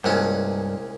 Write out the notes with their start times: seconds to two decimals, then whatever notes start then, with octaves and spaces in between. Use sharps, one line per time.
0.04 C2 G2 A#2 G#3 C#4